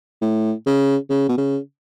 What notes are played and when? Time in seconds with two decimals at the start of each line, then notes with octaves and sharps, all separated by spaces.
0.22 A2
0.66 C#3
1.10 C#3
1.29 B2
1.37 C#3